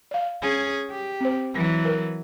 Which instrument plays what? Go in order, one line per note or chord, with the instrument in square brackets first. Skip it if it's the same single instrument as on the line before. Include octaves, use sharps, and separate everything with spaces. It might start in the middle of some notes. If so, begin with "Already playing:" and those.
[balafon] D5 F5
[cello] C#4 G#4
G4
[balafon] C4 C5
[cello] E3 F#3
[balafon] A#4 B4